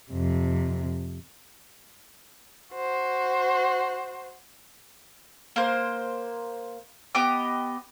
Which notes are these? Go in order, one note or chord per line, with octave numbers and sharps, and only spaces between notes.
F2 C3
F#4 C5
A#3 C5
B3 G4 D#5 D6